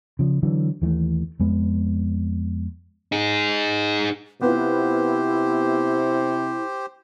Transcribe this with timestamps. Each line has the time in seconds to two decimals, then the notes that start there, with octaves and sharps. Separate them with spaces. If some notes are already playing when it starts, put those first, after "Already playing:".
0.19 C#3 F3
0.43 D3 E3 F#3
0.82 D#2 E3 F3 A3
1.40 F2 G#3 B3
3.12 D#4 G#4
4.41 C3 B3 E4 F4 G4 C5